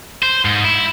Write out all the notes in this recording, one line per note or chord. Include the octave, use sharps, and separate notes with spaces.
C5
G#2
E4